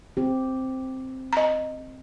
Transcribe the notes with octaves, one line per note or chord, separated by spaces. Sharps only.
C4 G4
D#5 A#5